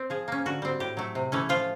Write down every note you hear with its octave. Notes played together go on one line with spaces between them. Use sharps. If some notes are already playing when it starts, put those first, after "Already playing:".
Already playing: C4
F3 G#4
A#3 C#4
D3 F#4
G3 C4
A2 G4
F#3 A3
C3
E3 A3 C#4
F3 F4